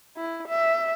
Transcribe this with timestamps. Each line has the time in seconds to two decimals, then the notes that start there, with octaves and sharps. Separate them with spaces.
0.17 E4
0.48 E5